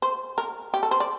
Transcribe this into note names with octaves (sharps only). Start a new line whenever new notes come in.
C5
A#4
G4
A4
C5
D5